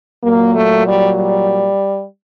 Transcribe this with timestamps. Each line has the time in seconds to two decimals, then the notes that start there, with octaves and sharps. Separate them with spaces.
0.24 A#2 F#3 A#3
0.55 A3
0.86 G3
1.17 G3